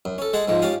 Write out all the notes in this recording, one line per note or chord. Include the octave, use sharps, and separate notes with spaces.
F#2
C#4 A4
G#3 G#4 F#5 A5
G#2 F3 G#3
C#4 G4 F5 A5 D#6